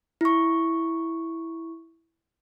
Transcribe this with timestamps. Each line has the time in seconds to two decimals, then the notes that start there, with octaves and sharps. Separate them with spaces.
0.21 E4 C#6